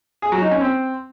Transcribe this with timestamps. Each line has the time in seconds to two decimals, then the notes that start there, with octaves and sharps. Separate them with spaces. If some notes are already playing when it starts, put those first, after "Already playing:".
0.22 G#4
0.32 F#3
0.42 D#4
0.51 C#4
0.61 C4